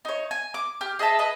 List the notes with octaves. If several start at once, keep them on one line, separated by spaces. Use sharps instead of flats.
D#4 C#5
G#5
D6
G4 F6
G#4 D#5 E5 A5
B4 D#5